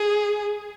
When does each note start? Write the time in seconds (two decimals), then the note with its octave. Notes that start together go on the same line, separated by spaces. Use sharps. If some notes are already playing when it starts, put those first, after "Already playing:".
Already playing: G#4